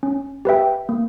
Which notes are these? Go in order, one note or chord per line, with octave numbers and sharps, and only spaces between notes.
C#4
G4 B4 E5 G5
A#3